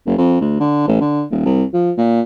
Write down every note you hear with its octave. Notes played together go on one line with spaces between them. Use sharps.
F#1
F2
D2
D3
A1
D3
D#1
C2
F3
A#2